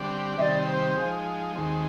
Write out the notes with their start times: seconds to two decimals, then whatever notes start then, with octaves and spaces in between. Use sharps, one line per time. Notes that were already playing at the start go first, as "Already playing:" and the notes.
Already playing: D3 G3 C4 G4 D5
0.37 C3 D#3 G3 C4 G4 D5 E5
0.67 C5
0.96 F3 G#3 D#4
1.55 D#2 D#3 G#3 C4